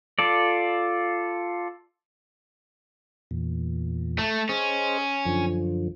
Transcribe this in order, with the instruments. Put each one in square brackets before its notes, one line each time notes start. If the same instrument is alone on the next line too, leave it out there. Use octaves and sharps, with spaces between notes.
[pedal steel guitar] F4 A4 D5
[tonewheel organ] E2 A#2
[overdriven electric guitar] A3
[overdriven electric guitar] C#4 [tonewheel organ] G#4 C5 D#5
[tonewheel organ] F#2 D3 F3